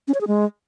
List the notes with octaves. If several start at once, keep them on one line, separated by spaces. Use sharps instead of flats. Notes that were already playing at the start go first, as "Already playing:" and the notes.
C#4
C#5
G#4
G#3